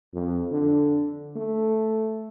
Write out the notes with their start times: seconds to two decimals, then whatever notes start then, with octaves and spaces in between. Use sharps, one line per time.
0.14 F2
0.51 D3
1.36 A3